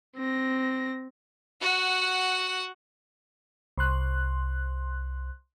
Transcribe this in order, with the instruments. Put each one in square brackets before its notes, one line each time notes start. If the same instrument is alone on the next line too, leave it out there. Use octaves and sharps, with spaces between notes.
[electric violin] C4 A#6
[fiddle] F#4 F#5
[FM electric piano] C2 C6 F#6